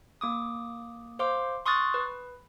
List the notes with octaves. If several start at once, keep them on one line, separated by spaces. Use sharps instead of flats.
A#3 D6 D#6
C5 F5 C6 D6
C6 C#6 D#6 F6 F#6 A6
B4